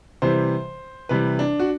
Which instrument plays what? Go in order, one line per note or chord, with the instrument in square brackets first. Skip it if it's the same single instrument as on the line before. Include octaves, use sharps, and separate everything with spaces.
[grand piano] C3 E3 G3 C5
C3 E3 G3 B4
D4
F#4